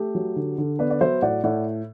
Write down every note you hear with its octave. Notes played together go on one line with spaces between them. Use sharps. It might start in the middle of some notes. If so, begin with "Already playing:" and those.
Already playing: A3 G4
F#3
D3
D3
B3 B4 D5
D5
F#3 C5 E5
A2 D5 F#5
A2 D5 F#5